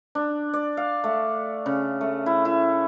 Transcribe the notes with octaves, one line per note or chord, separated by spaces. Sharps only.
D4
D5
F5
A3
C#3
A3
E4
E4